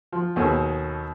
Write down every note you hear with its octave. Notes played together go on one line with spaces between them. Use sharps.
F3
D#2 B2 G#4 A4